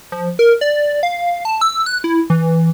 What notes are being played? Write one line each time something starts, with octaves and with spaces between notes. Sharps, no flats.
F3
A#4
D5
F5
A5
E6
F#6
E4
E3